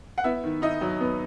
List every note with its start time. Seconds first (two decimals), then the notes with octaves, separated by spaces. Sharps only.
0.18 F#5
0.24 B3 E4 E5
0.44 D#3
0.62 D#4 E4 D#5
0.81 F#3
1.00 B3